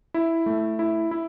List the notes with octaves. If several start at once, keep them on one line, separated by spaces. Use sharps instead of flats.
E4
A3
E4
E4